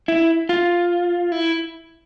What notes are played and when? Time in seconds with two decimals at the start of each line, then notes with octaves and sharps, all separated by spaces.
0.08 E4
0.49 F4
1.32 E4